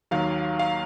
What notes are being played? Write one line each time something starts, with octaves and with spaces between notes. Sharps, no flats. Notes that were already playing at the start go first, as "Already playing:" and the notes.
D#2 D#3 F#3 F5
F5